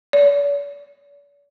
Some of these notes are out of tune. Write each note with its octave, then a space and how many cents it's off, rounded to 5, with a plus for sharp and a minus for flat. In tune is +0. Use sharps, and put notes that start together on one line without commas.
D5 -45